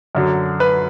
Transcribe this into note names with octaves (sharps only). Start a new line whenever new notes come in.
F#2 D3 F#3
B4